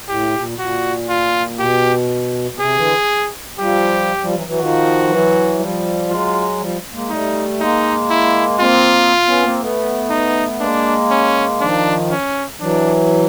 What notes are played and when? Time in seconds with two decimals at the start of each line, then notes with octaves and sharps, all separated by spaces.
0.08 A2 G4
0.34 A#2
0.59 A#2 F#4
1.09 F4
1.59 B2 G4
2.51 B2
2.59 C3 G#4
2.76 D3 E3
3.59 F3 G3 G4
4.22 F3 G3
4.35 E3 F#3
4.47 E3 F#3
4.59 D#3 F3 F#4
5.09 E3 F#3
5.59 F3 G3
6.09 F#3 G#3 F4
6.60 F3 G3
6.93 G#3 A#3
7.10 G3 A3 D#4
7.60 G#3 A#3 D#4
8.10 E4
8.59 A#3 C4 F4
9.27 B3 C#4
9.43 A#3 C4
9.60 A3 B3
10.10 D#4
10.60 G#3 A#3 D4
11.11 C#4
11.61 D#3 F3 D4
12.11 C#4
12.61 E3 F#3 D4